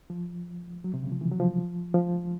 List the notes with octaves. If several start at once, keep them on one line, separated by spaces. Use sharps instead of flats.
F3
F#3
C3
C#3
F3
E3
F#3
F3
F3